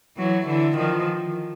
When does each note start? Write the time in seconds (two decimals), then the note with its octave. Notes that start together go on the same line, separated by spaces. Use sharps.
0.17 E3 F#3
0.46 D3 E3
0.77 D#3 F3